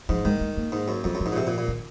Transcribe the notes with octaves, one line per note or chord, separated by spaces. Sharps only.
G#2 F3
D#3 G#3
G#3
A#3
G#2
F#2
F2 F#3
F#2
F3
G#2
A#2
C3
A#2
A#2
D#3